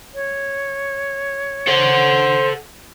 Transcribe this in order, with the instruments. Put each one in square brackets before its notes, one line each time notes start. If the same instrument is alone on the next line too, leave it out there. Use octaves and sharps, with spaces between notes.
[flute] C#5
[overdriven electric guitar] A4 F#5 [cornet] C5